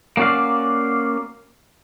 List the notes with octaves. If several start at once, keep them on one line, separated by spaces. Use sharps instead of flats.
A#3 C#4 F#4 D5 F5